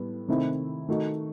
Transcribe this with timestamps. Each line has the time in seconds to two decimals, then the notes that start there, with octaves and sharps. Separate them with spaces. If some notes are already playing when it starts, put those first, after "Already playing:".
Already playing: A2 G3 B3
0.28 C3 D#3 A3 C4 E4
0.89 D#3 A3 D#4 F#4